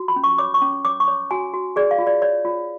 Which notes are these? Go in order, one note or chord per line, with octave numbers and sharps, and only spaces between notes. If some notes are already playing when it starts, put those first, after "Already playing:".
Already playing: F4 F#4
B5
C#4
C#6
C#5 D6
C#6
C#4
C#5 D6
C#6
C#5
F#4 G#5
F#4
G#4 D5
F5
F4
D5
C#5 D5
F4